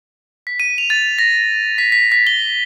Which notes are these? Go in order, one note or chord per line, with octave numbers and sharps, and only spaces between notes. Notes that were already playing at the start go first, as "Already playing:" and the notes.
B6
D#7
F7
A6
A#6
B6
B6
B6
G7